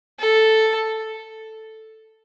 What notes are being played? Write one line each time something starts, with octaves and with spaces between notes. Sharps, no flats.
A4